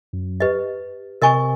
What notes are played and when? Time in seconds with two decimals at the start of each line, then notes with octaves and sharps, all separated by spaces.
0.13 F#2
0.40 G4 B4 D#5
1.22 C3 A#4 D#5 G#5 C#6